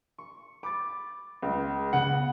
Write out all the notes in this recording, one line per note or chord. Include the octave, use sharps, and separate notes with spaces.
C#6
B5 D6 G6 A6
C#2
C#3 B3 F#5